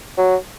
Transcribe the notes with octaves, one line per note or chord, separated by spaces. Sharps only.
F#3